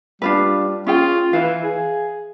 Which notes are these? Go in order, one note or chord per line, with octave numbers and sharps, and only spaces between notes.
G3 D4 F4 B4
C#4 F4 G#4 G5
E3 F5
G#4